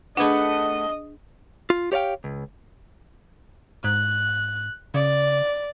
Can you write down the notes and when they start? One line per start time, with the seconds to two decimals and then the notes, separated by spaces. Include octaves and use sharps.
0.17 A3 D4 G#4 B4 D#5 F#5
1.70 F4
1.92 G4 C#5 D5 F5 G5
2.24 C#2
3.84 G#2 F#6
4.94 C#3 D5